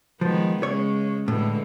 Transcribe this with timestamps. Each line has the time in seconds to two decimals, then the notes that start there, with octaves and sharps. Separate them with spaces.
0.21 D#3 F3 G#3 B3
0.63 C#3 G#3 C#5
1.28 A2 D3 E3 G#3